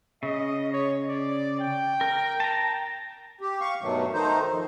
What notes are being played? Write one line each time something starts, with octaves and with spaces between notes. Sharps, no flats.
C#3 D#5
C#5
D5
G5
A#4
A5 A#5
G4
F5 C#6
G2 B2 D#3 F#3 A3
D#3 A3 D#4 C5
F3